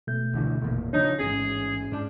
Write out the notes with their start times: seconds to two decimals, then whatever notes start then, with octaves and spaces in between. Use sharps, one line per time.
0.07 B2 A3 G6
0.33 C#2 D3 E3
0.61 G#1 E2 A#2
0.93 C#3 F3 D4 D#4 C#5
1.19 A1 G#2 C#4 G#4
1.92 G#2 F3 D4